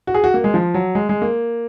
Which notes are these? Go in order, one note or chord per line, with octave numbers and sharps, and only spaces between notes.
F#4
G#4
F#4
A#3
G#3
F3
F#3
G#3
G#3
A#3